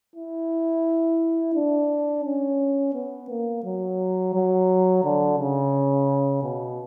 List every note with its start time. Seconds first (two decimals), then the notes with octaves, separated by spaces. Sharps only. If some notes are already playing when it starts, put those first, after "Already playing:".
0.16 E4
1.55 D4
2.25 C#4
2.94 B3
3.30 A#3
3.64 F#3
4.34 F#3
5.04 D3
5.39 C#3
6.44 B2